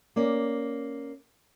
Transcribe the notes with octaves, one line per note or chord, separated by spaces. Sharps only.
A#3 C#4 D5